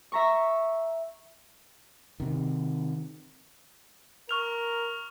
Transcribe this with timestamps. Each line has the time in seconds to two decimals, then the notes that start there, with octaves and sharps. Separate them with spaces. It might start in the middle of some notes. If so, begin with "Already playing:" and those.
0.12 E5 A#5 C#6
2.20 C3 D#3
4.29 A#4 C#6 F6 F7